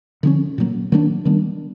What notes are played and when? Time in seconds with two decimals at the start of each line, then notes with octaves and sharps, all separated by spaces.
0.23 D3 F3 A#3 C#4
0.58 A#2 F#3 A#3
0.92 D#3 F#3 A#3 D4
1.25 D#3 G3 B3 D4